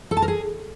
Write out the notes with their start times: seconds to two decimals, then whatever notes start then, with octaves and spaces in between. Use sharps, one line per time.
0.11 A4
0.17 A5
0.22 A#4
0.28 G#4